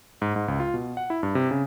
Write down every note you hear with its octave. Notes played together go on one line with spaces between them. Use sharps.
G#2
G#2
C#2
F4
B2
F#5
E4
G2
C3
C#3